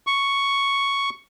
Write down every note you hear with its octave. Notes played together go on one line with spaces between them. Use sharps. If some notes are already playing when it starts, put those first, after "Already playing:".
C#6